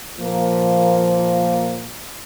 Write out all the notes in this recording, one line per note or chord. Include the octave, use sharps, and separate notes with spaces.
A#2 F3 A#3